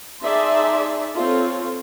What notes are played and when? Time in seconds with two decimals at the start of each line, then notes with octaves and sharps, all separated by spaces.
0.22 D#4 G#4 D5 E5 A5 C6
1.17 C4 F4 A4 C#5